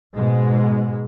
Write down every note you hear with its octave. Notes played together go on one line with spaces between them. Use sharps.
G#2 B2 G#3